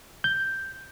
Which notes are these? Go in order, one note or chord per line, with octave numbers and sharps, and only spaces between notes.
G6